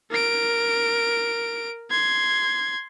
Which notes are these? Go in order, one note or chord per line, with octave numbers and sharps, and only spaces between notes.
A#4 D7
C6 G#6